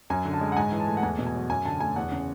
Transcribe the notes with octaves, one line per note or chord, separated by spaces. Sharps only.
F#2 G#5
D3
A5
G#3
F#5
G#2 G#5
E3
A5
A3
F#5
E2 G#5
B2
G#5
F#3
F#2 G#5
D3 A5
A3 G#5
E2 F#5
C#3